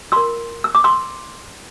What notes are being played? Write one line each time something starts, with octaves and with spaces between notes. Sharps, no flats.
F4 A#4 C6 E6
E6
D6
C6 E6